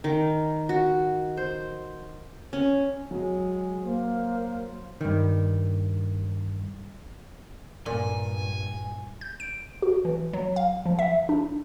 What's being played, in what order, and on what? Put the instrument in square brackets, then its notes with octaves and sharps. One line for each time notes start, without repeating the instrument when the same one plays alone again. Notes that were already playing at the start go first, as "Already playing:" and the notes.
[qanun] D#3
F#4
C5
C#4
[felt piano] F#3 [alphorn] G#3
[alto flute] A#3 [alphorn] C5
[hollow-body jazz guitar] G2 D#3
[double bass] G2 [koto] A#2 [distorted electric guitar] G#5
[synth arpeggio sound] G6
D7
F#4
E3
F#3
F5
F3
E5
D4